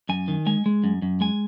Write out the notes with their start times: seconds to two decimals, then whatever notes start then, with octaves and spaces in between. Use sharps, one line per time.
0.09 F#2 G#5
0.28 D#3
0.47 G#3 G#5
0.66 G#3
0.84 F#2
1.02 F#2
1.21 G#3 G#5